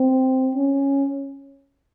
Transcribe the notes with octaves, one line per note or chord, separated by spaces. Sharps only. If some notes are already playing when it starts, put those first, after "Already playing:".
Already playing: C4
C#4